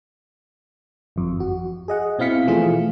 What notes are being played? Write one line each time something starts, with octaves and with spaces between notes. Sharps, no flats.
G1 F2
F#4
G#4 D#5 F#5
B2 C4 E4 F5 B6 C#7
E3 F3 A3 F4 G#4